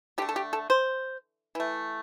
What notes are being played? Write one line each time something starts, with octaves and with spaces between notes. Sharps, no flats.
D3 A3 G4
A4
G4
A4
C5
E3 A3